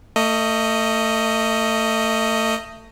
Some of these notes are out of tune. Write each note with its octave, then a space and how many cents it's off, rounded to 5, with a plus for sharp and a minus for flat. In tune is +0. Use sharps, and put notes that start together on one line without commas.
A3 +30 D#5 +0